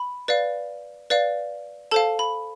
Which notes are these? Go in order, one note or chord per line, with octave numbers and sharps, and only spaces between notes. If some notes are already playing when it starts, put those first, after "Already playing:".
Already playing: B5
B4 D5 F5
B4 D5 F5
A4 C5 F5 A5
B5